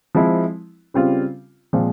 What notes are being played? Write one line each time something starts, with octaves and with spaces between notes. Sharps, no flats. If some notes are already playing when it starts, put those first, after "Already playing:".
F3 G#3 C4 E4
C#3 G3 C4 F4
A#2 F3 G#3 C4 F4